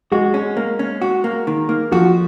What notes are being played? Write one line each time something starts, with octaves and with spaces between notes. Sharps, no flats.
G#3 F#4
C#4
A#3
C#4
F#4
A#3
D#3
A#3
F3 F#4